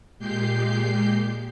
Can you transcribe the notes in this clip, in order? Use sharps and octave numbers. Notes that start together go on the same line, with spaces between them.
A#2 G#3 G4 G6 C7